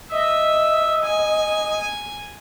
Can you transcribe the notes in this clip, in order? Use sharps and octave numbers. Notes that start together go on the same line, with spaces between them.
D#5 E5
G#5